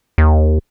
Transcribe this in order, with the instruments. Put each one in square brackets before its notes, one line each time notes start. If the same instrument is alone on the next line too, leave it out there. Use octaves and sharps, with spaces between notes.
[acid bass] D#2